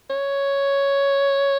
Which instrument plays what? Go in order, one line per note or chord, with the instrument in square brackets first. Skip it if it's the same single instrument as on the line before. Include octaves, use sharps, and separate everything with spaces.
[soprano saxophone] C#5